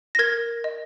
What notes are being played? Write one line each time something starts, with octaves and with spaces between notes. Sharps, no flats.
A#6
A#4 G#6
D#5